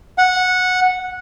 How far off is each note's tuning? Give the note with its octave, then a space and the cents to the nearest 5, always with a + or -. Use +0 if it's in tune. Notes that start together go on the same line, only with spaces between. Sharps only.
F#5 -10